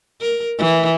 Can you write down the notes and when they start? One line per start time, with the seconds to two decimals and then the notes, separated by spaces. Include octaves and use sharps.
0.21 A#4
0.59 E3